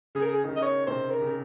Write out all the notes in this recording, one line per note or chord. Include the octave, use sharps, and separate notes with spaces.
C#3 G#4
A#4
G#4
D#3
C#3 D#5
C#5
C3 D#3 C5
A#4
C#3